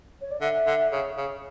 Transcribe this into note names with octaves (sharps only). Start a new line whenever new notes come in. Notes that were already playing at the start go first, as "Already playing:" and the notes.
C#5
D5
D3 E5
D3
C#3
C#3